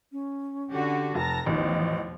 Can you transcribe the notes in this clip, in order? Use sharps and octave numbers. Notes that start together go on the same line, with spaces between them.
C#4
D3 F#4 G4
F1 A5 A#5 A#6
A1 E2 B2 D#3 F3 D#5